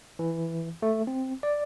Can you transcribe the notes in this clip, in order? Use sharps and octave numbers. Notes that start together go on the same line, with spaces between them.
E3
A3
C4
D5